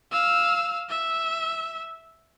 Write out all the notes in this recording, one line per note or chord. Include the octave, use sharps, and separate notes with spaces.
F5 E6
E5